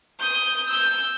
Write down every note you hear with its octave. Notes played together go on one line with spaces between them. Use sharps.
D#6 G6
E6 G6